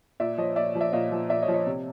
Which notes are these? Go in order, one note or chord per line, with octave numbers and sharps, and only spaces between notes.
A#2 D5 E5
F3 C#5 D#5
A#2 D5 E5
F3
D5 E5
A#2 D#5 F5
F3
A#2 D5 E5
C#5 D#5
F3
C#5 D#5
C3